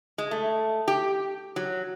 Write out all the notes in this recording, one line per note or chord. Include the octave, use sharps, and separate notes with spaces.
G#3
A3
G4
F#3